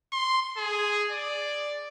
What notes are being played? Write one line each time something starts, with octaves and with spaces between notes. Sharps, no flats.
C6
G#4
D5